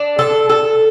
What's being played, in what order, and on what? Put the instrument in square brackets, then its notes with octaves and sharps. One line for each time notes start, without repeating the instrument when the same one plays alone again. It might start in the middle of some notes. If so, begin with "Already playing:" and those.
Already playing: [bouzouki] D4
A4
A4